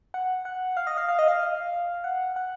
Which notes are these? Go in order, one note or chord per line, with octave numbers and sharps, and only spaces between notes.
F#5
F#5
F5
D#5
F5
F5
D#5
F5
F#5
F#5